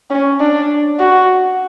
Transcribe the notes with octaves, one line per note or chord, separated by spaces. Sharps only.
C#4
D4
F#4